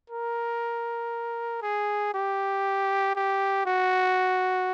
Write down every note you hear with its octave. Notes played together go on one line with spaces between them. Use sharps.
A#4
G#4
G4
G4
F#4